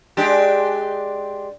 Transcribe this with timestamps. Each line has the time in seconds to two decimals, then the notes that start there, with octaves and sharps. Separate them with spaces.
0.17 G#3 D4 G4